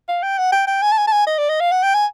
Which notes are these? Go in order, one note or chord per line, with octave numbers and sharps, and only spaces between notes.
F5
G5
F#5
G5
G5
G#5
A5
G#5
A5
G#5
D#5
D5
D#5
F5
F#5
G5
G#5